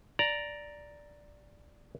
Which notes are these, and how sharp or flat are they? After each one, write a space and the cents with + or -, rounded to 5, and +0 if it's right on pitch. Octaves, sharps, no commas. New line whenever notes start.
D5 +0 A#5 +0